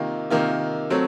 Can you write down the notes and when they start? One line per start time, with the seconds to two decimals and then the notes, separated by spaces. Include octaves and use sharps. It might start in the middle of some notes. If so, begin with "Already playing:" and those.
Already playing: C3 D#3 A#3 F4
0.30 C3 D#3 A#3 F4
0.90 F#3 A3 C4